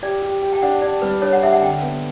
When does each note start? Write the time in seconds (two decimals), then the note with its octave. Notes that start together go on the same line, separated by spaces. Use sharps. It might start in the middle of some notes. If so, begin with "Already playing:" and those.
0.03 G4 D5
0.22 G4
0.42 G4
0.53 G5
0.62 D4 F#5
0.82 D4 D5
1.02 G3 B4
1.22 D4 C#5
1.33 F#5
1.42 G4 E5
1.52 F#5
1.62 D3 G5
1.82 B3